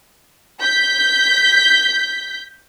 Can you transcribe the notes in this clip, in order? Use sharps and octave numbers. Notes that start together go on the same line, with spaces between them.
G6 B6